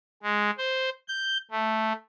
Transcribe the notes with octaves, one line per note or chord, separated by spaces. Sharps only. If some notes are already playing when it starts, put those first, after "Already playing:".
G#3
C5
G6
A3